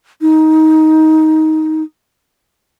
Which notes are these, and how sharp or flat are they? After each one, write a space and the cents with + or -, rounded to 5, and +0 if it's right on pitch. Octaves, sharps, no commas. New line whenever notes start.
D#4 +15